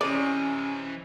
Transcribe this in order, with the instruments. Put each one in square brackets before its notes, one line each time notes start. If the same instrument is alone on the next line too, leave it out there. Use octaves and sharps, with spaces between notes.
[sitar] C3 [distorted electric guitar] E3 D#5 [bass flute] C#4 [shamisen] D5